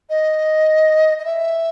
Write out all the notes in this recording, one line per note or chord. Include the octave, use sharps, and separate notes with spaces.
D#5
D#5
E5